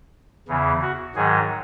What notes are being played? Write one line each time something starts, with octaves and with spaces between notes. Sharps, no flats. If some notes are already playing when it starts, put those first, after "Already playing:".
E2 C#3 E3
F#4
G#2 D#3 F#3 G#4